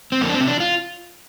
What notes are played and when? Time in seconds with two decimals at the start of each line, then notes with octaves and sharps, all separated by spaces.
0.12 C4
0.21 F2 A#3
0.29 D4
0.34 C4
0.41 C3
0.48 D4
0.60 F4